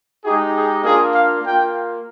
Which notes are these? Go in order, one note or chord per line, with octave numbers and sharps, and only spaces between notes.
G#3 D#4 G4 G#4
G#4
A#3 D4 F4 G#4
F5
A#3 F4 G5